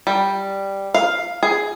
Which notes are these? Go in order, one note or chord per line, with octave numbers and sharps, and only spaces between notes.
G3
F5
G#4